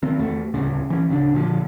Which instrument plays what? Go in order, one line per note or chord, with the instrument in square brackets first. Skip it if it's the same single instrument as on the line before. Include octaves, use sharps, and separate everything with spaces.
[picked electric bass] D#3 C4
E2 A3
D1 C2 C#3
E3 C#4
D1 C#3 C#4 D4
A#2 D3 D#3 F3